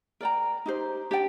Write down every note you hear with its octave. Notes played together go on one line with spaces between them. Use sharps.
A#4 D5 G5 A#5
D#4 G4 C5
D4 G4 D5 G5